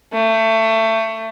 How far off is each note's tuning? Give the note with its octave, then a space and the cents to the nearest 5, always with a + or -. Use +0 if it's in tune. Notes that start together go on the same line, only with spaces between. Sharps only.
A3 +25